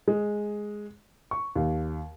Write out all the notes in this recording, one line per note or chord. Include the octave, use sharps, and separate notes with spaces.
G#3
C#6
D#2